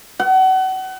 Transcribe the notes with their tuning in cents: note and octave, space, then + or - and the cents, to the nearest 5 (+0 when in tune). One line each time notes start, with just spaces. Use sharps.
F#5 +30